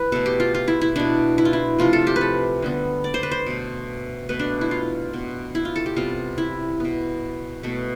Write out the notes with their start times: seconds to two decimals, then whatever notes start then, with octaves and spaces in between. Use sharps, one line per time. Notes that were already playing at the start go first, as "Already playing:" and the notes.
Already playing: E3 B4
0.12 B2 A3 A4
0.26 G4
0.40 F4
0.54 F4
0.68 E4
0.81 E4
0.96 B2 B3 D4
1.38 E4
1.45 F4
1.53 E4
1.78 C3 F3 A3 F4
1.93 A4
2.07 G4
2.16 B4
2.21 A4
2.62 D3 G3 B3
3.04 D5
3.14 C5
3.23 B4
3.31 C5
3.46 B2 A3
4.29 B2 A3 B4
4.39 D4
4.61 E4
4.71 F4
5.13 B2 B3
5.55 E4
5.65 F4
5.76 A4
5.86 G4
5.96 C3 G3 B3 F4
6.38 E4
6.80 B2 B3
7.63 B2 A3